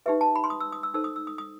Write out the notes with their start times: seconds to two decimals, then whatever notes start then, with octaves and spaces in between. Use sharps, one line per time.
0.06 D#4 G4 B4 E5
0.21 A5
0.36 B5
0.44 C6
0.50 D#6
0.60 E6
0.72 D#6
0.83 E6
0.94 D#4 A4 C5 E6
1.04 D#6
1.16 E6
1.27 D#6
1.38 D#6